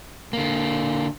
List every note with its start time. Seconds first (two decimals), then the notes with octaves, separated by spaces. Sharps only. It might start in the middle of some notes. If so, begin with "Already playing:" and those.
0.33 D3 A#3